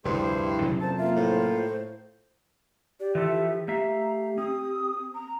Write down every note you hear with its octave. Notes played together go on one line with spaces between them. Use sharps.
F1 D2 G2 E4 G4 G#4 C5
C3 F#3 C#4
F2 A#2 F3 C5 A5
A#3 F4 E5
A2 C5
G4 D5
E3 F3 A4 E5
A3 G4 E5 F5 A#5
C4 D#6
A#5